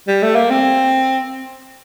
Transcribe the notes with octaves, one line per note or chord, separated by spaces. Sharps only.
G3
A3
A#3
C4